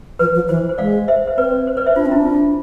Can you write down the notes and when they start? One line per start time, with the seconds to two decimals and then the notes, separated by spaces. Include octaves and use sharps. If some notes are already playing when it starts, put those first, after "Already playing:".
0.19 F3 B4
0.34 F3
0.48 E3 C5
0.69 C5
0.78 G#3 D5 F5
1.08 C5 E5
1.28 C5
1.38 C4 B4 D5
1.67 C5
1.77 B4 D5
1.86 C5 E5
1.96 D4 F4
2.06 C4
2.12 E4
2.16 D4
2.26 F4